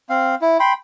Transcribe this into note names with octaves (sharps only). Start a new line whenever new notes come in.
C4 F5
E4
G5 B5 C6